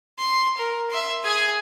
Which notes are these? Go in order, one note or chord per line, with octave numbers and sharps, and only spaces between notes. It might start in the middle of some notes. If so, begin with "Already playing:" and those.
C6
A#4
E5 C6
G#4 G#5